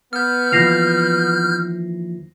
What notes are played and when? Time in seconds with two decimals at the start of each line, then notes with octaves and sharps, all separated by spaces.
0.13 B3 F6 G6
0.52 D#2 E3 F3 A#6 C7 F7